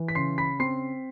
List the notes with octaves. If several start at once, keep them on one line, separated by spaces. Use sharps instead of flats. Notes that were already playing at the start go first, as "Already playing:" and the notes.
Already playing: E3
B6
C#3 C6 C7
B5 B6
C4 C6 C7